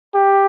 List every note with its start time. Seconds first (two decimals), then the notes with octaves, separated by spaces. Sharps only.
0.15 G4